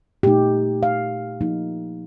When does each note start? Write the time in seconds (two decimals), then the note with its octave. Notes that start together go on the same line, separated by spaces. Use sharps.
0.23 A#2 A3 D#4 G4
0.83 F5
1.41 F3 A#3 D#4